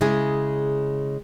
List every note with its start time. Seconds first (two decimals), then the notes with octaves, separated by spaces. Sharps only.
0.01 C#3 G#3 E4 G#4